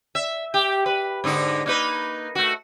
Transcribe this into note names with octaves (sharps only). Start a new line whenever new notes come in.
E5
G4
B4
G#2 D3 D#4
A#3 D#4 B4
A3 F#4